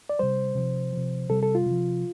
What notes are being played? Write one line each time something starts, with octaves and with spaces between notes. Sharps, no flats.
D5
C3 G3 C5
C3 F3
C3 F3
C3 G3 A4
A4
F4
C3 F3